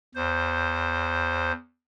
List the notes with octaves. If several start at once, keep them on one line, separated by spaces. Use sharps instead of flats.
E2 C5